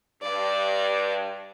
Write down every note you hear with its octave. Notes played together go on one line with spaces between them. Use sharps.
G2 D5